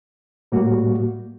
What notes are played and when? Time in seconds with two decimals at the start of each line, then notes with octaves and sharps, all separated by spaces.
0.52 A2 G3 A#3 F#4